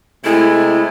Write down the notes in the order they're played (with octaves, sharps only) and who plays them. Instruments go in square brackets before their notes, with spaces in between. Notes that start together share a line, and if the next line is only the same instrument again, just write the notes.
[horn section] C3 G#3 A3 [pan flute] E4